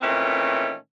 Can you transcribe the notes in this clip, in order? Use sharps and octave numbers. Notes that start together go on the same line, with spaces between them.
A#2 D#3 E3 A3 C4 C#4